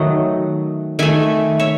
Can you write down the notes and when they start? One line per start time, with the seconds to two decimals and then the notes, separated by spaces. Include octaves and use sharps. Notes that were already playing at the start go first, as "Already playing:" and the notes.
Already playing: D#3 F#3 A3 D#5 F#5
0.99 D#3 A3 E5 G#5
1.59 C#5 E5